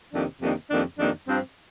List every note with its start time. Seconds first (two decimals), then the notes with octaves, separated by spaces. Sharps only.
0.14 F2 C3 D#3 A#3 D4
0.42 F2 C3 D#3 A#3 D4
0.71 F2 C3 D#3 A#3 D4
0.99 F2 C3 D#3 A#3 D4
1.28 G2 F3 C4